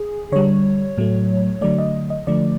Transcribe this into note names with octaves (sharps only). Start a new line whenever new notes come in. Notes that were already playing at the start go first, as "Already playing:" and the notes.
Already playing: G#4
D3 G3 C#5
A2 F#3 A3
D3 F#3 A3 D5
D#5
D#5
D3 F3 A3 D5